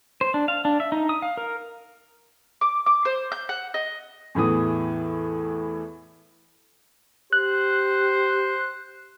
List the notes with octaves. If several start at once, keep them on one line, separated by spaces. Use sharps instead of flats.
C5
D4
F5
D4
E5
D#4
D#6
F5
A#4
D6
D6
C5
G6
F#5
D#5
E2 A2 E3 D#6
G4 C5 F#6